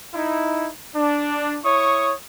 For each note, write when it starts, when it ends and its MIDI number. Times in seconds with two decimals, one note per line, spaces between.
0.14 0.69 63
0.14 0.69 64
0.96 1.58 62
1.65 2.14 64
1.65 2.14 73
1.65 2.14 85
1.65 2.14 87